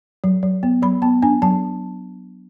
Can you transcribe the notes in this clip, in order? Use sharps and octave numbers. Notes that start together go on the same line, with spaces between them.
F#3
F#3
B3
F#3 B5
B3 A5
D4 G#5
F#3 A5